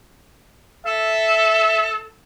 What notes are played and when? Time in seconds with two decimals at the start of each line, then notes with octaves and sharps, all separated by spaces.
0.86 A4 E5